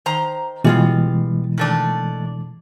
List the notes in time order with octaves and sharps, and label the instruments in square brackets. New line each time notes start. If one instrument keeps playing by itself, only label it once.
[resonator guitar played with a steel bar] D#3 C5 A#5
[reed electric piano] B2 E3 G#3 [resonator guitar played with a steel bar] G3 B3 F4
[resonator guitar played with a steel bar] D#3 A3 D4